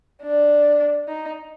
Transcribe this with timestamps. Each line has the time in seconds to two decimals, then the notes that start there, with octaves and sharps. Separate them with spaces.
0.23 D4
1.08 D#4